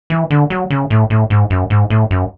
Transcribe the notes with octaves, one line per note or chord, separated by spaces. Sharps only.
E3
D3
F#3
C#3
A2
A2
G#2
F#2
G#2
A2
F#2